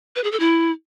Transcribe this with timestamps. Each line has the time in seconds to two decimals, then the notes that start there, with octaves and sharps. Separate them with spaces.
0.16 B4
0.24 G#4
0.32 A4
0.40 E4